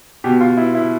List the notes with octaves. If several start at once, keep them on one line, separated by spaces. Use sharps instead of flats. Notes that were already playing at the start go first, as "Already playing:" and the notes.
B2 G4
F4
E4
E4